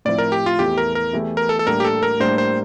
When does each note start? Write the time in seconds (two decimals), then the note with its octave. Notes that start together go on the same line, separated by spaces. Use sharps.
0.05 A2 F3 C4 E4 D5
0.18 A#4
0.32 G4
0.46 F4
0.59 E2 E3 A3 G4
0.77 A#4
0.95 A#4
1.13 E2 E3 A3 E4 G4
1.37 A#4
1.49 A4
1.59 A4
1.67 A2 G3 A#3 D4 A#4
1.80 G4
1.85 A4
2.03 A#4
2.20 A2 G3 A#3 D4 C5
2.38 C5